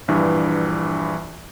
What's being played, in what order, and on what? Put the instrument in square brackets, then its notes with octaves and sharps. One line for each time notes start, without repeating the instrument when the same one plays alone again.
[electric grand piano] A#1 G2 E3